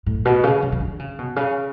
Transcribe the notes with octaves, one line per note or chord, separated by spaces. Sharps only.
A2
B2
C#3
C#3
C#3
D3
C#3
B2
C#3